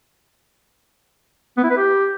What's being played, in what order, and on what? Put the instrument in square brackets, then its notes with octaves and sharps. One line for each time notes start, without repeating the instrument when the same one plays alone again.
[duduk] B3
E4
B4
G4